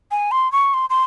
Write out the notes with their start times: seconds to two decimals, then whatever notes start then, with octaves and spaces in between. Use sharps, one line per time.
0.11 G#5
0.31 C6
0.52 C#6
0.74 C6
0.90 C6